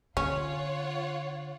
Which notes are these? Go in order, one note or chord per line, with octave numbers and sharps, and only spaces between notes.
D3 C#4 F4 C#5 F#5